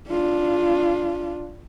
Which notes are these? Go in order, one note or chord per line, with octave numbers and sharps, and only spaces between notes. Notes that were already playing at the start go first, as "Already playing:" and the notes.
D4 F4